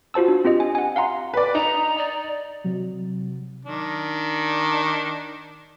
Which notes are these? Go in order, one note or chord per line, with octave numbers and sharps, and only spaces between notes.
F4 F#4 C5 A5 E6
D4
C4 F4 G4 D#5
G#5
F#5 G#5
F5 F#5 A#5 C6
B4 D5
D#4 A#5
D5
C3 F#3
D#3 D4